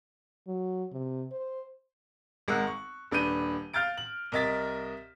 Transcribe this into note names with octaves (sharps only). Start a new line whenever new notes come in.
F#3
C3
C5
G#1 G#3 A#4 F#5 E6 F#6
C#6
D#1 D4 B4 G6 D#7
F5 F6 G6 A6 D7
F#7
C2 A#4 D#5 E5 A6 B6